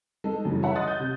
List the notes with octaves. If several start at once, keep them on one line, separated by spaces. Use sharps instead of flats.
G#3 D#4 A4
F#2 C#3 E3 G3
C#5 E5 F#5
D#5 C6 D#6 F#6 A6
G6
C3